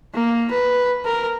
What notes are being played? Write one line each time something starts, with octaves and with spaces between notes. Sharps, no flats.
A#3
B4
A#4